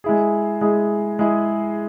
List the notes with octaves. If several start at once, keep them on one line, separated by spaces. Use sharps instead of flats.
G#3 E4 G#4
G#3 E4 G#4
G#3 E4 G#4